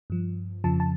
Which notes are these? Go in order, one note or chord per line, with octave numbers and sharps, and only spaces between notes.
G2 F3
F2 C#3 F3 A5
A5